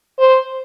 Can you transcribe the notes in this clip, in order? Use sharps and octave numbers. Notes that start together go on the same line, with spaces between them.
C5